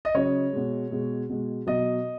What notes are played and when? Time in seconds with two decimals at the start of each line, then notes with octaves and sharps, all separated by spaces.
0.05 D#5
0.14 C#3 F#3 C#5
0.53 B2 G#3
0.91 B2 G#3
1.30 B2 G#3
1.67 B2 F#3 D#5